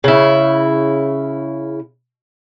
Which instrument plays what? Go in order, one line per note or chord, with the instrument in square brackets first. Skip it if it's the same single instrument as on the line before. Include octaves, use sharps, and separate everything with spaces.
[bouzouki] C#3 E4